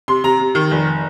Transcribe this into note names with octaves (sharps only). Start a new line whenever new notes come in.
C3 C6
C3 A#5
C3
D#3
F1